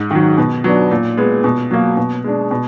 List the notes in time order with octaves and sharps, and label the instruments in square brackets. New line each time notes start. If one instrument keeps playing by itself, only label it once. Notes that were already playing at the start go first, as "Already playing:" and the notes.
Already playing: [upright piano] G#2
D#3 F#3
B2
F#3 B3 D4
A#2
G#3 B3
B2
F#3 A#3
B2
G#3 D4
B2